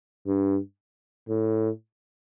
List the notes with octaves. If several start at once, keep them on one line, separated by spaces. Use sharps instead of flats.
G2
A2